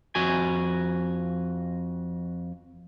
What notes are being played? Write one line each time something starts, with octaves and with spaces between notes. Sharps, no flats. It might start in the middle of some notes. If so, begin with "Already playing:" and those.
F2 F#4 G#5